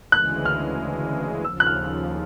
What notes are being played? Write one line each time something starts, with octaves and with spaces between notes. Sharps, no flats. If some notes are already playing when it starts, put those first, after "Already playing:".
D2 C#3 E3 G#3 F#6
F6
D#2 C#3 F3 E6
F#6
F6